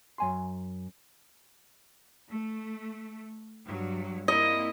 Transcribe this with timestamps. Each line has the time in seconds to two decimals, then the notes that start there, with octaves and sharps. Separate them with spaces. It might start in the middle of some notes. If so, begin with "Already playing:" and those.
0.18 F#2 G#5 C6
2.30 A3
3.65 G2 F#3
4.28 A#3 C4 E4 D#5